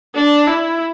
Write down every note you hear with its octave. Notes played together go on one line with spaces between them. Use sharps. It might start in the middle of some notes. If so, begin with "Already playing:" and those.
D4
E4